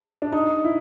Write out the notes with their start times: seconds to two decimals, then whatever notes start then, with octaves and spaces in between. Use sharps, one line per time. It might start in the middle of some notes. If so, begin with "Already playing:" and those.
0.22 D4
0.32 D#4
0.65 E4